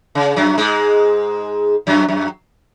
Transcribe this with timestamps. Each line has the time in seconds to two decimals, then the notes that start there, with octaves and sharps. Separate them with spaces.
0.15 C#3
0.36 F#2 F#3
0.58 G#2 G#3
1.87 F#2 F#3
2.08 F#2 F#3